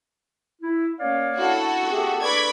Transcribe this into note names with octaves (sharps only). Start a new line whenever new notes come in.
E4
A#3 C#4 C#5 D5 F5
D4 E4 F#4 A4
A#3 C4 G4 G#4 E5
D4 A4 B4 D5 B5 C#6 D6 G#6